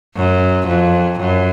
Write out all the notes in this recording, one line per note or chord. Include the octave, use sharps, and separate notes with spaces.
F#2
F2
F#2